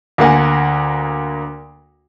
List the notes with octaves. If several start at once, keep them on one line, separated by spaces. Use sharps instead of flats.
D2 A#3 F#5 G#5